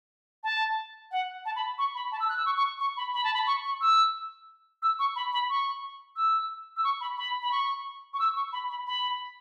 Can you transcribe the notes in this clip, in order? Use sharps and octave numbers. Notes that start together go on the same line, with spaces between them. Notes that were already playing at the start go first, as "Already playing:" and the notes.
A5
F#5
A5
B5
C#6
B5
A5
E6
F#6
E6
C#6
C#6
C#6
B5
B5
A5
B5
C#6
C#6
E6
E6
C#6
B5
B5
C#6
E6
E6
C#6
B5
B5
B5
C#6
C#6
E6
C#6
B5
B5
B5